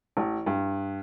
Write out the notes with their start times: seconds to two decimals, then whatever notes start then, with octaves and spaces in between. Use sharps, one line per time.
0.17 A1
0.46 G2